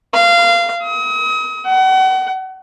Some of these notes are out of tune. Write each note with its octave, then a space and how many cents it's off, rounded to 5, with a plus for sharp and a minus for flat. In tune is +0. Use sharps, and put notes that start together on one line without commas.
F5 -20
D#6 +40
F#5 +35